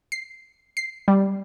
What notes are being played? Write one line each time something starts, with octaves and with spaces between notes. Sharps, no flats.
C7
C7
G3